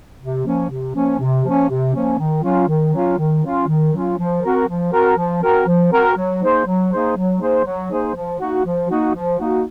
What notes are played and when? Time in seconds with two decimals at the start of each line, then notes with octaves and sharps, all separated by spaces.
0.21 C3
0.45 F3 A#3 C#4
0.70 C3
0.95 F3 A#3 C#4
1.20 C3
1.44 F3 A#3 C#4
1.69 C3
1.94 F3 A#3 C#4
2.19 D#3
2.43 F#3 C#4 F4
2.68 D#3
2.93 F#3 C#4 F4
3.18 D#3
3.43 F#3 C#4 F4
3.67 D#3
3.93 F#3 C#4 F4
4.18 F3
4.42 C4 F#4 A#4
4.67 F3
4.92 C4 F#4 A#4
5.17 F3
5.42 C4 F#4 A#4
5.67 F3
5.92 C4 F#4 A#4
6.17 F#3
6.41 A#3 D#4 G#4 C5
6.66 F#3
6.91 A#3 D#4 G#4 C5
7.16 F#3
7.40 A#3 D#4 G#4 C5
7.65 F#3
7.90 A#3 D#4 G#4 C5
8.15 F3
8.39 A#3 D#4 F#4
8.65 F3
8.89 A#3 D#4 F#4
9.14 F3
9.39 A#3 D#4 F#4